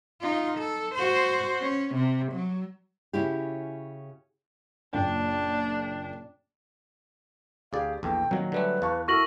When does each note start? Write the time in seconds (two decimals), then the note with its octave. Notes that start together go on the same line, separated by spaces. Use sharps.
0.21 D#4 F4
0.58 A4
0.95 F#4 C5
1.61 C#4
1.95 C3
2.33 F#3
3.13 C#3 C#4 E4 F#4 G4
4.93 F#1 A#2 D4 G5
7.73 D2 G4 G#4 D5 F5
8.03 A#1 E2 A4 G5
8.31 A#2 D#3 F#3
8.52 D3 G3 A3 B4
8.82 E2 F5 A5 C#6
9.08 E4 F#4 A4 A#4 C#6 A#6 F#7